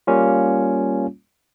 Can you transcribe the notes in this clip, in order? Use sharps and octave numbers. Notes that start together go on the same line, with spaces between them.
G3 A#3 C#4 F4